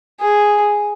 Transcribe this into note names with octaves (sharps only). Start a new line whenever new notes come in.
G#4